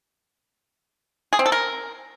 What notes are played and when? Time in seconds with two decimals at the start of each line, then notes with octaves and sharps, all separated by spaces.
1.33 G#4
1.39 C4
1.46 A4
1.52 A#4